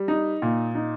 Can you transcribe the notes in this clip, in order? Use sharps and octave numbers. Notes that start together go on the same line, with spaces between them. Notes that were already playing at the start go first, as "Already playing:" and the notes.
Already playing: G3
D#4
A#2
D#4